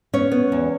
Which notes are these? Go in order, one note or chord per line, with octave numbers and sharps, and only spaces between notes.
B3 C#4 C#5
B3
E2